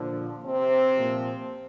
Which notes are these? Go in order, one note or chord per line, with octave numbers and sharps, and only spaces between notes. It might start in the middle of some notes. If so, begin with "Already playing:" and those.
Already playing: A#2 D3 F3 D4
C3 C4
A#2 F3